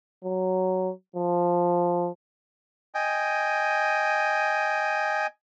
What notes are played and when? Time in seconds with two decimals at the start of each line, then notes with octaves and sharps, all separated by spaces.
0.24 F#3
1.16 F3
2.95 D#5 G5 G#5